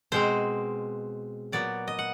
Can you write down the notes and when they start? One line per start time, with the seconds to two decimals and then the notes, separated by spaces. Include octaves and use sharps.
0.12 B2 G#3 C4 C5
1.52 A#2 F#3 B3 D5
1.88 D#5
1.99 F#5